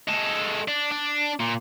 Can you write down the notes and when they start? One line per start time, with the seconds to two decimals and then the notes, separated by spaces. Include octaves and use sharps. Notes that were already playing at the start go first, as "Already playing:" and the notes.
0.08 G#3 A4
0.68 D4
0.92 D4
1.41 A#2